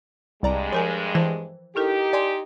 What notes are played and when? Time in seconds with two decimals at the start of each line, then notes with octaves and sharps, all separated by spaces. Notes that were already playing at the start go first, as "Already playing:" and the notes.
0.43 C2 G2 G#3 D5 A#5
0.73 F3 A#4 D#5 G#5
1.15 E3 C5 G5 A5
1.76 D#4 E4 G4 A4 A#4
2.13 D5 G#5 C6